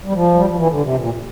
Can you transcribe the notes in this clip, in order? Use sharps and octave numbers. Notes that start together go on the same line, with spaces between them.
G3
F3
G3
F3
E3
D3
C3
A#2